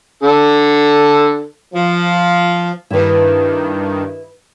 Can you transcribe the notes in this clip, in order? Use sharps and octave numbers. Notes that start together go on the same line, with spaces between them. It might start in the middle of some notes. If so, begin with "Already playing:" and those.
D3 A4
F3
G2 D#3 E4 B4